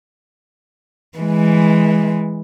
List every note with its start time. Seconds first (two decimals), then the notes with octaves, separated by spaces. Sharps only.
1.18 E3 G#3